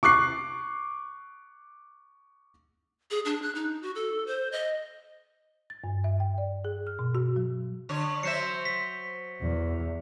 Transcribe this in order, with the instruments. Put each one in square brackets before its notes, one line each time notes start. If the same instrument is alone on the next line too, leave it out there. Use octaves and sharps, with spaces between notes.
[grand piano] C#6 D6 F#6 C7
[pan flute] G#4
D4
F#6
D#4
F#4
A4
C5
D#5
[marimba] A6
G2
E5
G5
D5
G#4
F6
B2
F#4
F#3
[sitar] D3 C#5
[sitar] F#3 C5 E5 [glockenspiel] C#7
[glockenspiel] B6
[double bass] E2